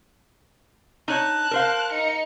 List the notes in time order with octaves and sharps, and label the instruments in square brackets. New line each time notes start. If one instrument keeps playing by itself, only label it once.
[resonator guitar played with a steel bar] D#4 C#5 [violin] A5 F#6
[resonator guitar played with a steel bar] A#4 C5 F5
[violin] D#4 C#7